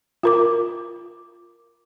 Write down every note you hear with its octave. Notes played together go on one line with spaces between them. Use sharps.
F4 A#4 D6